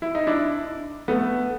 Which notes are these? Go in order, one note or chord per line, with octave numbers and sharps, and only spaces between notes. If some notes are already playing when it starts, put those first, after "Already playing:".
E4
D#4
D4 E4
A3 B3